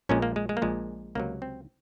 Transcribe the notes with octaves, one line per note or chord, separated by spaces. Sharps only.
A#1 A#2 G#3 C#4
A#3
G#3
G#3
A#3
A#1 A#2 G#3
C#2 C3 F#3 A#3
C4